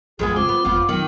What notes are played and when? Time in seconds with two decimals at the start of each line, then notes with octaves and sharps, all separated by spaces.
0.19 A#1 F2 G#3 B3 G#4
0.37 C#3 C4 F4 C5 D6
0.49 B3
0.65 G1 F2 F3 B3
0.89 D#3 F#3 B3